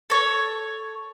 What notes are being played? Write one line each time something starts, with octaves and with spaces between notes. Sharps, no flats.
A4 C#5